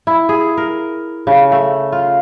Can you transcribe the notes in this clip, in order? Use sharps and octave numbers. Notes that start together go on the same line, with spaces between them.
E4
G#4
A#4
C#3
A3
F4